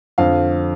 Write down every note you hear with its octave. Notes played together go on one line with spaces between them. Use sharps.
F2 D3 F3 F5